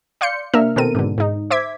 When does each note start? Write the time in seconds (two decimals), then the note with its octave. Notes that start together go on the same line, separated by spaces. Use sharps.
0.21 D5 F5 C6 G6 C#7
0.53 C3 A#3 D4 A#4 E5 F6
0.76 B2 D#3 C4 A4 A#4 D#7
0.95 G#2 B2 D3
1.18 G#2 D#4
1.50 C5 E5 D6 G#6 B6